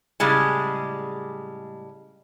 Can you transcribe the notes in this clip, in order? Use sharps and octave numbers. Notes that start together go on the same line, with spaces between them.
A2 C#3 G3 G#3